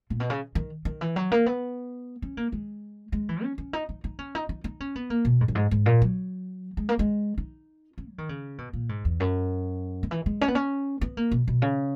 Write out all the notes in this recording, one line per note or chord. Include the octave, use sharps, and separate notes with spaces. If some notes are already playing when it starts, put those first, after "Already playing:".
A#2
B2
C#3
D#3
D#3
E3
F#3
A#3
B3
C#4
A#3
G#3
G#3
E3
C#4
C#4
D#4
D#4
D#4
C#4
D#4
D#4
D#4
C#4
B3
A#3
B2
G#2
F#2
G#2
G#2
A#2
F#3
G#3
A#3
G#3
D#4
C#4
F#3
D#3
C#3
B2
A#2
G#2
E2
F#2
D#3
E3
G#3
C#4
B3
C#4
B3
A#3
B2
B2
C#3